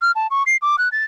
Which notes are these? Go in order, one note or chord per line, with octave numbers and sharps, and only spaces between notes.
F6
A5
C#6
C7
D6
F#6
A6